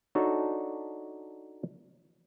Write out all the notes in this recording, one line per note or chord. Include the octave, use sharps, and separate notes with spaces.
D4 D#4 F#4 A4 C#5